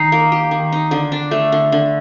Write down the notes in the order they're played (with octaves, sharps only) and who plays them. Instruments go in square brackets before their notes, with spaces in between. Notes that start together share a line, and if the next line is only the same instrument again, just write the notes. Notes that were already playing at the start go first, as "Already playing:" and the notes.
Already playing: [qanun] D#3 D#4 [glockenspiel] C7
[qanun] A#3
G4
D#3
D#4
D3
D4
A3
D3
D3